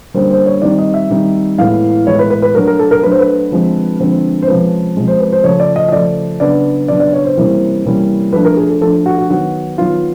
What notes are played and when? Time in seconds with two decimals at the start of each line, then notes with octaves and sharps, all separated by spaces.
0.14 D3 G3 A#3 C#4 C5
0.30 C5
0.46 C#5
0.62 D#3 G3 C4 D#4 D5
0.78 D#5
0.94 E5
1.10 D#3 G3 C4 D#4
1.58 A2 E3 G#3 B3 E4 F5
2.06 A2 E3 G#3 B3 E4 C#5
2.19 B4
2.30 B4
2.42 B4
2.55 F#3 A3 D4 A#4
2.67 A#4
2.79 A4
2.91 A#4
3.03 F#3 A3 D4 B4
3.11 C5
3.19 B4
3.51 D3 F3 G#3 C4
4.00 D3 F3 G#3 C4
4.42 C5
4.47 C3 F3 G#3 C#4 B4
4.96 C3 F3 G#3 C#4
5.08 C5
5.20 B4
5.33 C5
5.44 C#3 F3 A3 C#5
5.60 D5
5.76 D#5
5.89 D#5
5.92 C#3 F3 A3 D5
6.40 C#3 F#3 B3 D4 D5
6.88 C#3 F#3 B3 D4 D5
7.00 D5
7.13 C#5
7.25 C5
7.37 C3 E3 G3 A#3 C#4
7.85 C3 E3 G3 A#3 C#4
8.33 F3 A3 D4 B4
8.45 A#4
8.57 G#4
8.69 A4
8.81 F3 A3 D4 A4
9.06 F#4
9.18 F#4
9.30 D#3 F#3 B3 F#4
9.78 D#3 F#3 B3 F4